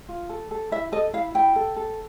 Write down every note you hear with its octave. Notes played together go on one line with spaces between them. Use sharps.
F4
A4
A4
E4 E5
A4 D#5
E4 F5
E4 G5
A4
A4